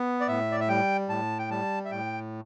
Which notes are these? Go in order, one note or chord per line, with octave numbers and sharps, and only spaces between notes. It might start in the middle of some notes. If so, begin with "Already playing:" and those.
Already playing: B3
D5
A2 E5
D5
E5
G3 G5
A2 A5
G5
G3 A5
E5
A2 G5